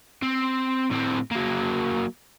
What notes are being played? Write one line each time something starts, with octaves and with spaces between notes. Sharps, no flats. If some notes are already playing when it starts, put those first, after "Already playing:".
C4
A2 C4
F#3 A#3